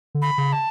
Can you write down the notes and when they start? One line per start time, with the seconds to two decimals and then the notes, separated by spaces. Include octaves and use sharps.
0.15 D3
0.22 B5
0.38 C#3
0.52 A5